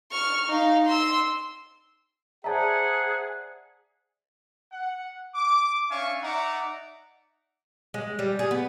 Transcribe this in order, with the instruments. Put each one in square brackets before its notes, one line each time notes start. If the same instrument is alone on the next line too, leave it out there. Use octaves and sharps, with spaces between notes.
[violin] C#6 F6
D#4 F5
C6 E6
[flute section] G#4 [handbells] C5 D5 E5 [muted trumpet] F#5 [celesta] A5 A#5
[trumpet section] F#5
D6
C#4 D4 E5 F5 G#5 C#6
D#4 D5 E5 F#5 A#5 D6
[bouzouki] G#3
G3
G#4
B3